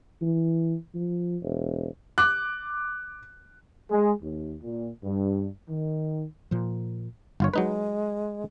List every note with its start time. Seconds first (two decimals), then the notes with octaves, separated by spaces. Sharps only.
0.22 E3
0.95 F3
1.42 E1
2.18 D6 F#6
3.91 G#3
4.22 D#2
4.62 A#2
5.04 G2
5.69 D#3
6.51 A#2 F3
7.40 G1 F4 C#5
7.54 F#3 G#3 D#4 B4